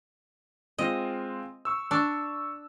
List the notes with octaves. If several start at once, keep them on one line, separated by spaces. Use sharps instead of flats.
G#3 C4 F4 D#5
C#6 E6
D4 C#6 E6